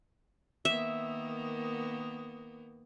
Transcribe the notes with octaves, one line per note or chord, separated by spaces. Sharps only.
D#3 A#3 B3 E5